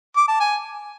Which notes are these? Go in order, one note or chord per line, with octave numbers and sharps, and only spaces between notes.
D6
A5
G#5